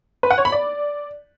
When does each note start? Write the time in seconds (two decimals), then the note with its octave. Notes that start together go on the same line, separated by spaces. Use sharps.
0.23 B4
0.31 F#5
0.38 C#5
0.45 B5
0.52 D5